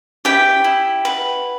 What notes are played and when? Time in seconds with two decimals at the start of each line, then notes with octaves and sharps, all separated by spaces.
0.25 E4 G4 G5
0.64 E4
1.05 B4 F#5